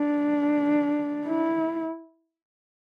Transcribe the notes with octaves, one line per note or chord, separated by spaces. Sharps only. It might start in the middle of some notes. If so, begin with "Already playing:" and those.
Already playing: D4
E4